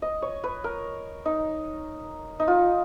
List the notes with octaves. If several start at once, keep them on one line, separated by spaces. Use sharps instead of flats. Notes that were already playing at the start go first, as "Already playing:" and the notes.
D#5
C#5
B4
A#4
D#4
D#4
F4